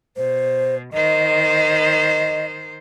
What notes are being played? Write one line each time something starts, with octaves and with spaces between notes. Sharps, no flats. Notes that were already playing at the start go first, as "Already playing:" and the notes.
B2 C5
D#3 C5 D#5